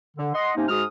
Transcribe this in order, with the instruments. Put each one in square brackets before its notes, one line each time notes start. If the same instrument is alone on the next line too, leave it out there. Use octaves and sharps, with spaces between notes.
[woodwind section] D3
D#5 F#5 C6
C3 A#3 C#4 D#4
G#2 G#3 F#4 G#4 D#6 F6